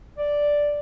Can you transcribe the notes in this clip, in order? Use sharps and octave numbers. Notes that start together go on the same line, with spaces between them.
D5